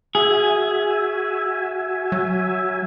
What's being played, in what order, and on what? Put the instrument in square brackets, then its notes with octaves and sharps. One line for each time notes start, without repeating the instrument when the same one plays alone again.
[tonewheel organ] F#4 E5 G#5 [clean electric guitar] G#4
[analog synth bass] F#3